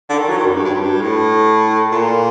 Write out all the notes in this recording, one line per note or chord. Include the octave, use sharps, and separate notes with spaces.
D3
D#3
F#3
D#3
F#2
G2
G2
F#2
G2
A2
A#2